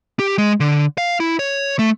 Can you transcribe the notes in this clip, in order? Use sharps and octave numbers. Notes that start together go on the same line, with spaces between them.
G4
G#3
D3
F5
E4
C#5
A3